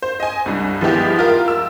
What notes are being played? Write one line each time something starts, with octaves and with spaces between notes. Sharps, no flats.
C5
D#5 G#5
C2 G2
F3 G#3 B3 E4 G4
F4 A#4
E6